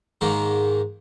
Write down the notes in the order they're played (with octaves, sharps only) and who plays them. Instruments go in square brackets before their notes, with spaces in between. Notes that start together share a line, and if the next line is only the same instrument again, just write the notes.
[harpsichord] G#2 D#3 A#3